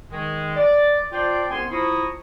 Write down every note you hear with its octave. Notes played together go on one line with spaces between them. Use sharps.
D#3 G#3
D5
D4 F4 C5 D5 G5
C2 B3 C#4 G#5 C6
F3 E4 F4 A#5 C#6 D#6